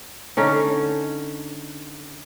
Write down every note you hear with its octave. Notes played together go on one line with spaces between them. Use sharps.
D3 C#4 D#4